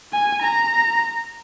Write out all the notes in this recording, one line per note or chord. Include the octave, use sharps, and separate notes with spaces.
G#5
A#5